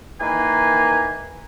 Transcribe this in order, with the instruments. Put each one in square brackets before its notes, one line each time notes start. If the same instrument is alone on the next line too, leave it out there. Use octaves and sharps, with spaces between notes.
[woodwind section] D#3 E3 A#3 B4 G#5